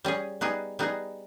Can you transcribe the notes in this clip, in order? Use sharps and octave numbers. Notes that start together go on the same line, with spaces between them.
G3 C#4 G#4
G3 B3 D#4 G#4
G3 B3 D#4 G#4